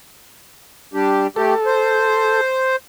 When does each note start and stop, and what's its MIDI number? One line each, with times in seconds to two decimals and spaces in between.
0.94 1.27 55
0.94 1.27 62
0.94 1.27 67
1.36 1.54 57
1.36 1.54 67
1.36 2.41 69
1.66 2.76 72